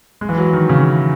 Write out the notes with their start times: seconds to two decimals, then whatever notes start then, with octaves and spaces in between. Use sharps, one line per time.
0.21 G#3
0.29 E3
0.38 F#3
0.53 D#3
0.69 C#3